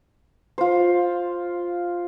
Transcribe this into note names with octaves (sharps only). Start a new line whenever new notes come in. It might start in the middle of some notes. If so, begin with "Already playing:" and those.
F4 C5